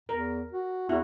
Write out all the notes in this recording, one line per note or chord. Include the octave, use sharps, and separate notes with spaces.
E2 A#4
F#4
E2 E4 F#4